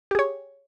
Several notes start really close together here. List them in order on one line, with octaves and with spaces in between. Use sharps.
G4 G#4 C#5